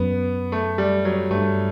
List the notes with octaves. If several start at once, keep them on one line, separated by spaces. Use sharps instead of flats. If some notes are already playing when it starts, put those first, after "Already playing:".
Already playing: F#2 B3
A3
G3
F#3
G2 A3